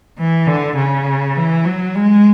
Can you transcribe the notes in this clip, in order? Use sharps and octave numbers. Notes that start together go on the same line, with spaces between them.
E3
D3
C#3
E3
F#3
G#3